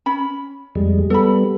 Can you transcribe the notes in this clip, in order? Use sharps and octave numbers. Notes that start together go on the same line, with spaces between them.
C#4 B5
F2 G3 G#3
G3 B3 A4 B5